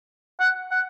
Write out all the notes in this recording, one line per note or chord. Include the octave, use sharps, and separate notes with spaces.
F#5
F#5